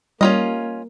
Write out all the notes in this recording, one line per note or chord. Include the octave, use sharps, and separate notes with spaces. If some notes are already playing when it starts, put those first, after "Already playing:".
G3 A#3 C#4 F4 D#5